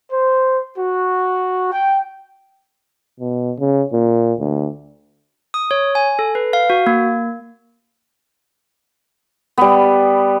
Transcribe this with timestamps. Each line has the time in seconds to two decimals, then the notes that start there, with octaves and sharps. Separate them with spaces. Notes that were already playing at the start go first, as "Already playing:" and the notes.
0.11 C5
0.78 F#4
1.72 G5
3.20 B2
3.59 C#3
3.92 A#2
4.39 D2
5.54 D#6
5.71 C#5
5.95 G#5
6.19 A4
6.35 B4
6.53 F5
6.70 F#4
6.87 A#3
9.58 G3 B3